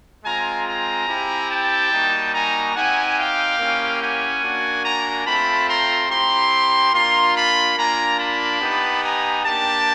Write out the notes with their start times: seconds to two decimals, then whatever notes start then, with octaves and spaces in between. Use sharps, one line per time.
0.24 G#3 C4 F4 G#5 A#5
0.67 G#5 A#5
1.07 C4 E4 G4
1.50 G5 A5
1.92 G3 A#3 D#4 F#4
2.33 G#5 A#5
2.75 C4 D#4 G4 F#5 G#5
3.17 F5 G5
3.59 A#3 C#4 E4 G4
4.01 F#5 G#5
4.43 A#3 D4 F#4
4.84 G#5 A#5
5.26 A3 C4 F4 A5 B5
5.68 A#5 C6
6.10 C4 E4 G4 A#5 C6
6.93 A#3 D4 F4 A#5 C6
7.35 A5 B5
7.77 A#3 D4 F4 G#5 A#5
8.19 A5 B5
8.61 B3 D#4 G4
9.02 G#5 A#5
9.44 A#3 D4 G4 G5 A5